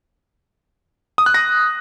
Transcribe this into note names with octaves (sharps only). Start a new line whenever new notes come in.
D#6
F#6
A#6